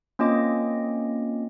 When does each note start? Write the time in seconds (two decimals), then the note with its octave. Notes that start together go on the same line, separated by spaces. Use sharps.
0.19 A#3 C4 C#4 F4 D#5 D6